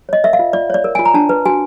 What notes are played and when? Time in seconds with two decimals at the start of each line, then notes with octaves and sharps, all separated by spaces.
0.09 C#5 D#5
0.24 A#4 E5
0.33 F5
0.39 F4
0.53 F4 D5
0.70 C#5 D5
0.84 A#4
0.95 F4 G#5
1.05 A#5
1.14 D4 A5
1.29 B4
1.45 F#4 G#5